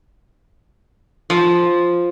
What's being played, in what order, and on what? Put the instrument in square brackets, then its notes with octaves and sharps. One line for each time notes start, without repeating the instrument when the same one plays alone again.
[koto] F3